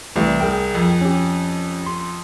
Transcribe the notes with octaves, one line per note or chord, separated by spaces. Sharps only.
C2 E3 G3 A3
G#4 A#4 G5
F2
C#4 G4
C6